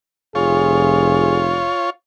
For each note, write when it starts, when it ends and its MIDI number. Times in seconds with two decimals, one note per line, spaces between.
0.35 1.71 29
0.35 1.90 65
0.35 1.42 68
0.35 1.90 73